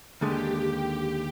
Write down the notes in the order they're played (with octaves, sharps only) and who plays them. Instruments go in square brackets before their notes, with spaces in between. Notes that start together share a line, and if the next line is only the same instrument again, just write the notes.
[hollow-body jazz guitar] D#2 D3 G#3 [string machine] G4